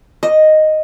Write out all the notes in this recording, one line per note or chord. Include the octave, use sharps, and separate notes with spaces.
D#5